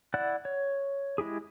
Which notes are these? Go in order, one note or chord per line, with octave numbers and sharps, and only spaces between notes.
E4 D5 F#5 F#6
C#5
G#3 E4 G4 G#4